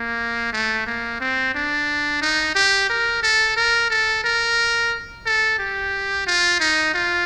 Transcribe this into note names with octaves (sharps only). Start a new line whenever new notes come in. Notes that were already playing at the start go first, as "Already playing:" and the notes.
Already playing: A#3
A3
A#3
C4
D4
D#4
G4
A#4
A4
A#4
A4
A#4
A4
G4
F4
D#4
F4